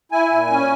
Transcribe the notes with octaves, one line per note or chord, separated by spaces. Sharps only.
E4 G#5
A#2
C#4